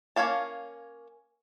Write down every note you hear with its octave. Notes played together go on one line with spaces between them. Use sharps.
A#3 C#4 C#5 F5 A5